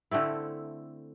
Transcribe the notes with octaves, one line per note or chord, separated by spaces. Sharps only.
D3 A3 C4 E4